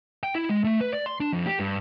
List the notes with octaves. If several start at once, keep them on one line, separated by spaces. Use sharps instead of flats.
G5
E4
G#3
A3
B4
D5
C6
D4
F2
G4
G2